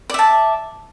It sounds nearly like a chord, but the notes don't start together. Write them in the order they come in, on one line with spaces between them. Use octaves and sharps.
D5 E5 A5